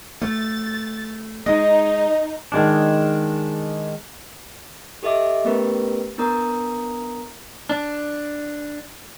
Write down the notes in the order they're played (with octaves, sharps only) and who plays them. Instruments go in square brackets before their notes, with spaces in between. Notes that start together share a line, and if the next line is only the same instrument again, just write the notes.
[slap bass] A3 [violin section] A6
[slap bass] G#3 [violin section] D#4 [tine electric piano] D#5
[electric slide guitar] D#3 G#3 D4
[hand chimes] G4 A4 D#5 E5 D6
A3 B3 C#4 G4 A#4 B4
B3 D4 A#4 A#5 D#6
[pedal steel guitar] D4